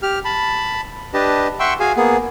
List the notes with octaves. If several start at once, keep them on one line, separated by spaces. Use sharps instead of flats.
G4 F6
A5 B5
D4 G4 B4 D#5 A5
E5 F#5 G5 C6 C#6 E6
F#4 G#4 F5 G#5
A#3 B3 G#4